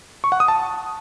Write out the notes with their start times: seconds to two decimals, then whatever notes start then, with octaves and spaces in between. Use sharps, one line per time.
0.24 C#6
0.32 F#5
0.40 D#6
0.48 A5